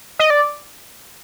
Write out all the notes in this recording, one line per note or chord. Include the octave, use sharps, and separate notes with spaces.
D#5
D5